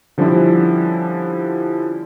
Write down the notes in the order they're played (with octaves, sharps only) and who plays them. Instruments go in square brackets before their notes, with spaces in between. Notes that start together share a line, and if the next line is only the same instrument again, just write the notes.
[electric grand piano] D3 F3 G3 C#4 D4 E4